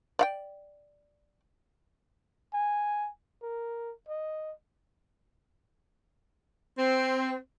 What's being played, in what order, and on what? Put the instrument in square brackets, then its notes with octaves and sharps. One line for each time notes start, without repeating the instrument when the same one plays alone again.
[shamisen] D5 F5 G5
[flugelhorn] G#5
A#4
D#5
[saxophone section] C4